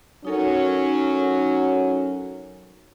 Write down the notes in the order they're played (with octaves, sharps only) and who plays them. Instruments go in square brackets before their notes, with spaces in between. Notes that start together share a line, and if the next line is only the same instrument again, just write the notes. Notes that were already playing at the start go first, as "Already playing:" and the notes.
[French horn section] F#3 C#4 [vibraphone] D#4 A4 A#4